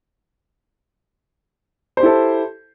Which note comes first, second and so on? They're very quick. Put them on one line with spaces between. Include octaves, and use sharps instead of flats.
C5 G4 E4 A4